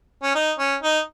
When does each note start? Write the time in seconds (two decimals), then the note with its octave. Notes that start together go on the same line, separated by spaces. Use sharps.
0.23 C#4
0.35 D#4
0.59 C#4
0.83 D#4